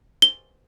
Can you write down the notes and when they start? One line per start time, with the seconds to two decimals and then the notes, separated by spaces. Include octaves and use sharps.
0.22 G7